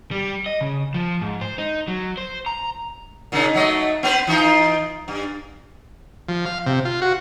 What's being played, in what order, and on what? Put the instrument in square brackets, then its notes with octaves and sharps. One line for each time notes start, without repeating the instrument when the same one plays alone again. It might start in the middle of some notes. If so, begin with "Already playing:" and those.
[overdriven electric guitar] G3
D#5
C#3
F3
G#2
C5
D#4
F#3
C5
A#5
[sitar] A#2 C#3 D#4
F#3 A3 D#5
B3 B4 C5
E3 D#4 F4
G2
[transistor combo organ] F3
F5
C3
F4
F#4